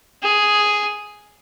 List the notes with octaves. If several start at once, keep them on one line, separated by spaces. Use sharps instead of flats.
G#4